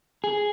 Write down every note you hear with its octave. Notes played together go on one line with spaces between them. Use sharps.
G#4